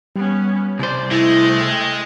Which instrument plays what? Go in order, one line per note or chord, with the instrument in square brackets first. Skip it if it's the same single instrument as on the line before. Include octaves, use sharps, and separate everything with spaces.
[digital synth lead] G3 [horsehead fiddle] B3 C#4
[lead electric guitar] C2 C5 [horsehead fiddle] D5
[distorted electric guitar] G#3 [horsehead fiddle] A3 [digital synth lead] E4
[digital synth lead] G5